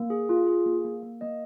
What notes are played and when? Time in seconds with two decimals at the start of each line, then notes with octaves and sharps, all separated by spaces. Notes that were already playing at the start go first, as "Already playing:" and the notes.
Already playing: A#3
0.10 G#4
0.29 F4
0.47 G#4
0.66 A#3
0.85 A#3
1.03 A#3
1.21 A#3 D#5